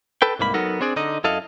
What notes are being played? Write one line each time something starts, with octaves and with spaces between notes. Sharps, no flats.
A4 B4 G5
C2 G#2 A#3 B5
F#3 B3 D#4 F#4 A4 A#4
C4 D4 G#4 D5
D3 D#4 D#5
F#2 E4 A4 D#5 F5